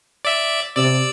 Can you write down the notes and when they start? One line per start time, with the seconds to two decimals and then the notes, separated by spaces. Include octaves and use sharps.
0.25 D5 E5
0.76 C3 D5 E6